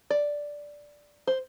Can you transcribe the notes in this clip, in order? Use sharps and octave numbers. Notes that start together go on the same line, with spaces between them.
D5
C5